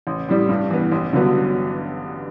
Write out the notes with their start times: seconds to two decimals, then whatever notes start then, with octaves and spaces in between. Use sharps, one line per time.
0.07 A1
0.28 A2 G3
0.49 G2
0.70 E3 B3
0.92 A1
1.13 G2 D3 F#3 B3